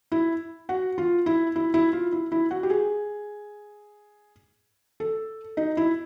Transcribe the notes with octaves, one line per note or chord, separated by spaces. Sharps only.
E4
F#4
F4
E4
E4
E4
F4
E4
E4
F#4
G4
G#4
A4
D#4
E4